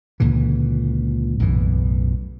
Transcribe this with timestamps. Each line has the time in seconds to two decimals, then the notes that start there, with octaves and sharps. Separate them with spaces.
0.20 C#2 A#2 D3 E3
1.39 B1 F#2 A2 E3